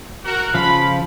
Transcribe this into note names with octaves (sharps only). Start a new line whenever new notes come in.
F#4 A#4
C#3 F3 F5 B5